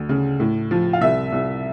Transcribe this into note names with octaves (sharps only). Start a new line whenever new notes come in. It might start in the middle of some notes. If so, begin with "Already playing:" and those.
Already playing: D2
C#3
A2
F3
F5
C2 E5
C2